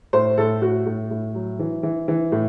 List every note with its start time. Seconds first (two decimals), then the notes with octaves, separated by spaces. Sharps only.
0.13 A2 C5
0.38 A2 A4
0.62 A2 F#4
0.86 A2
1.11 A2
1.35 F#3
1.59 E3
1.83 E3
2.08 E3
2.32 A2